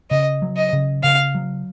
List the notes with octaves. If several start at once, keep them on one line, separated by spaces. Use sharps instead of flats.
C#3 D#5
F#3
D#5
C#3
C#3 F5
F#3